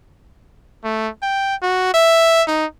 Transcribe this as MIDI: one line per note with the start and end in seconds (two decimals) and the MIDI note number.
0.84 1.09 57
1.23 1.56 79
1.62 1.90 66
1.94 2.43 76
2.48 2.66 63